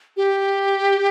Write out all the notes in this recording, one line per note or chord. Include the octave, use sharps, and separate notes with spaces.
G4